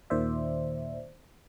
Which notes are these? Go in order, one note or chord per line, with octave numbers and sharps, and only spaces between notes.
D#2 A#2 D#3 C5 D5 E5